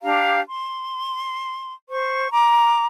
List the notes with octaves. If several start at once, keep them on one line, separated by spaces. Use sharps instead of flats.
D4 G4 F5 A#5
C6
C5 C#6
A#5 D6